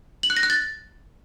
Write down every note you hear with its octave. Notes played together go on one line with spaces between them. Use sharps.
F#7
F#6
A#6
F#6
A6